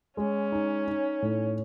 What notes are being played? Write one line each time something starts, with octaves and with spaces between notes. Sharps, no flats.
G#3 C#4
D#4
D#4
A2